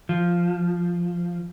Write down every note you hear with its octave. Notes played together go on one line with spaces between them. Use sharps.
F3